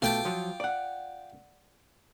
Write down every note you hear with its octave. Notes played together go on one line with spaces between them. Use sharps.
B2 A3 F4 G5 D6
F3 F#3
D5 F#5